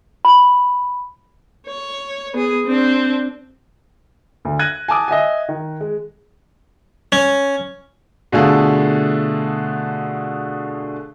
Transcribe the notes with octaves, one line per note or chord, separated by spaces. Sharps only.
B5
C#5
B3 G#4
C4 D4
D2
F#6 G#6 A#6 D#7
G#5 A5 D6 D#6
D#5 E5 F#5 G#5
D#3
G#3
C#4
B2 D3 A3 F4 G#4 A4